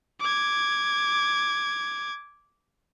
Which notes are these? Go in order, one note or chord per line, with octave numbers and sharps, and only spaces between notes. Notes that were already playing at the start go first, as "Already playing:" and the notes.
D6 G#6